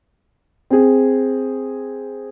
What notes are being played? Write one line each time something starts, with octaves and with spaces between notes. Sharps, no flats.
C4 G#4